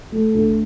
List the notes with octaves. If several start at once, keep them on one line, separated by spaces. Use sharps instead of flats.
A3
D2